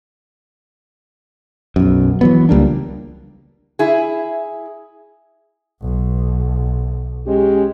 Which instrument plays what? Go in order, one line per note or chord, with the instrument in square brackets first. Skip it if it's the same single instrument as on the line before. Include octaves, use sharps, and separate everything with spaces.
[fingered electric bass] B1 F#2
E3 F#3 B3
C#2 G3 A#3 D4
[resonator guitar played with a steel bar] E4 G#4
[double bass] B1
[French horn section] G#3 C#4 G4